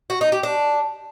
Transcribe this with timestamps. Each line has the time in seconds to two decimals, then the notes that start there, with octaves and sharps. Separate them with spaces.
0.10 F#4
0.21 D#4
0.32 G4
0.43 D4